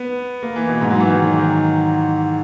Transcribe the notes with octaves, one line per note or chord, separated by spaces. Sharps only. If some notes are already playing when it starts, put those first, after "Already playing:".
Already playing: B3
A#3
E3
B2
G#2
F#3
E3
D#3
E3
D#3